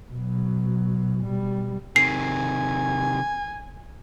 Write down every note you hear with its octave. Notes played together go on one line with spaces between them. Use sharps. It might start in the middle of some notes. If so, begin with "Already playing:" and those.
B2 F#3
B2 G3
C3 D#3 G#5 C7